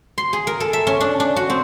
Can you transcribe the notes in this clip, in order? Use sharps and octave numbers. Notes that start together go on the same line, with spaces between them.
C6
G#4
A#4
A4
E5
C#4
D4
D4
F#4
C4